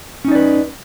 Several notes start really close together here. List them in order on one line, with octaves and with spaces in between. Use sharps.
C#4 D#4 D5 B4